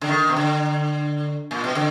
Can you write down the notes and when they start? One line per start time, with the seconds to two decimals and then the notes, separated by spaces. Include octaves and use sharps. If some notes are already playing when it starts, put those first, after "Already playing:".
0.01 D3
0.09 D#3
0.29 B2
0.37 D3
1.51 A#2
1.64 B2
1.75 D3